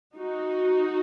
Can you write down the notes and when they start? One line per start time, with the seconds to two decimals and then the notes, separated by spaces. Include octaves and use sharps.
0.16 D#4 F#4